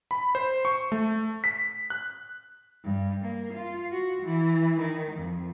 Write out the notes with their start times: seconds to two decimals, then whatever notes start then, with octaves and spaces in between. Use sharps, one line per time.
0.11 B5
0.35 C5
0.65 C#6
0.92 A3
1.44 B6
1.90 F#6
2.84 G2
3.21 A#3
3.54 F4
3.92 F#4
4.23 E3
4.80 D#3
5.16 F2